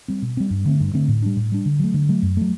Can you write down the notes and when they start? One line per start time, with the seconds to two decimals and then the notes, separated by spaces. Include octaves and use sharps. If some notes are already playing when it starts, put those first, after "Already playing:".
0.08 G3 C4
0.22 B2
0.37 G3 C4
0.51 G2
0.66 D3 A3 C4
0.80 G2
0.94 D3 A3 C4
1.08 A2
1.23 G3 D4
1.37 A2
1.52 G3 D4
1.66 D3
1.79 F#3 A3
1.94 D3
2.09 F#3 A3
2.23 F#2
2.37 F#3 A3